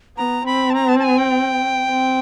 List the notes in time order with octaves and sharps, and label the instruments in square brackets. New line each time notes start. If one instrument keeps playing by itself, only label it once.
[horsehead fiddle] B3 [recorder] A#5
[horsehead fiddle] C4 [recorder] B5
[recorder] A5
A#5
A5
A5
G#5
G5
[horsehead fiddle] C4